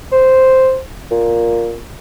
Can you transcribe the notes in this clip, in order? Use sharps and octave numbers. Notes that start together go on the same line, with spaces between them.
C5
A#2